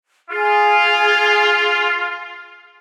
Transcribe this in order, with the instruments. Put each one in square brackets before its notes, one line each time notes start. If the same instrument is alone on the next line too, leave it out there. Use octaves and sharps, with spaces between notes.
[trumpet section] F4 [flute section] G#4